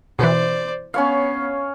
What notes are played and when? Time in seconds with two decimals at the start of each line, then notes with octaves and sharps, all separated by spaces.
0.19 B2 E3 C5 D5
0.94 B3 C#4 C#5 F5